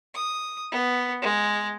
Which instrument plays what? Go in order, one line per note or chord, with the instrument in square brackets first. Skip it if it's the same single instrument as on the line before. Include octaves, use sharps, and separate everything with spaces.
[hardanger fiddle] D#6
B3
G#3